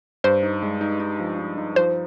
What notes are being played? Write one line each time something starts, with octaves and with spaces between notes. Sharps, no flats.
G2 C5
D#4
G#3
D#4
D#4
F3
D#4
D#4
F3 C5